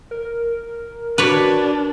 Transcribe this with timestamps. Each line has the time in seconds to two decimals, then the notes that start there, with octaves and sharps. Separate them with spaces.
0.11 A#4
1.18 D4 F#4 B4 C#5 D5